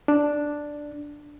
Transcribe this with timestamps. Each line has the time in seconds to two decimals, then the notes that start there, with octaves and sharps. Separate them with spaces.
0.08 D4